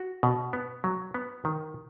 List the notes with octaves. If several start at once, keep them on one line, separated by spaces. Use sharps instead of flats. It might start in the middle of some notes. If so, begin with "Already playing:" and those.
Already playing: F#4
B2
B3
F#3
B3
D#3